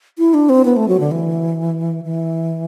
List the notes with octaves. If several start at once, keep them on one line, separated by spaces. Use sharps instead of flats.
E4
D4
C4
B3
A3
F#3
D3
E3
E3